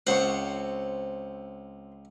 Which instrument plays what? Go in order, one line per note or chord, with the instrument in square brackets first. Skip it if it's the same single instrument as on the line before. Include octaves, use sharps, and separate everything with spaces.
[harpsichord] C#2 F#5 [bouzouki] C4 C#5